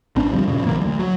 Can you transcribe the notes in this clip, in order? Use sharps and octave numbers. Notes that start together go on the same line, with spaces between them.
A#1 C4 D4
D2 F3 G3
F#2 A#2 C#3
A#1 E3 F#3 A#3
D2
F#3